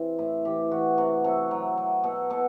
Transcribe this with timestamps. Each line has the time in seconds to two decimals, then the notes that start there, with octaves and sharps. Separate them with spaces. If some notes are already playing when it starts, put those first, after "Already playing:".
Already playing: C3 E3 C4
0.18 A2 E4
0.45 E3 G4
0.71 E3 F#4
0.98 C3 F#4
1.24 C3 A4
1.51 F#3
1.78 F#3
2.04 B2 A4
2.30 B2 A4